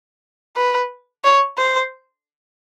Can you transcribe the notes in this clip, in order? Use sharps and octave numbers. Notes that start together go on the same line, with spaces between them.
B4
C#5
C5